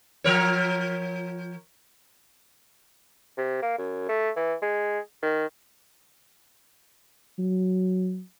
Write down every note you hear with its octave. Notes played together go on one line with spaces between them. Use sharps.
F3 A#4 C#5
C3
A#3
F#2
A3
E3
G#3
D#3
F#3